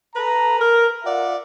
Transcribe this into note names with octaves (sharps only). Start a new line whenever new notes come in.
A4 B4 A#5
A#4
F4 D5 E5 F#5